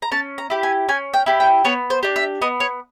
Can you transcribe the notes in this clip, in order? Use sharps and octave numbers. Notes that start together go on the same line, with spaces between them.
A#5
C#4 A5
A#5
E4 G4
G#5
C#4 G#5
G5
E4 G4
G5
B3 C#5
C5
D4 G4
E5
B3 D#5
C#5